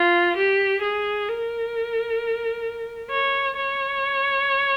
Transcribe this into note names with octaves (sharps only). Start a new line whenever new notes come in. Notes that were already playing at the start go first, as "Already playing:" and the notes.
Already playing: F4
G4
G#4
A#4
C#5
C#5